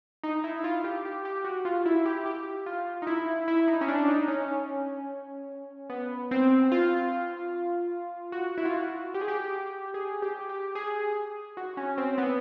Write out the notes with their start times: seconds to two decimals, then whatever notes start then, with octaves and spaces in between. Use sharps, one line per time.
0.24 D#4
0.44 E4
0.64 F4
0.84 G4
1.05 G4
1.25 G4
1.44 F#4
1.65 F4
1.86 E4
2.05 G4
2.26 G4
2.66 F4
3.02 D#4
3.07 E4
3.48 E4
3.68 D#4
3.81 C#4
3.88 D4
4.08 D#4
4.28 C#4
5.90 B3
6.31 C4
6.72 F4
8.32 F#4
8.58 E4
8.65 F4
8.73 F#4
9.14 G4
9.21 G#4
9.28 G4
9.94 G#4
10.22 G4
10.49 G4
10.75 G#4
11.57 F#4
11.77 C#4
11.98 C4
12.18 B3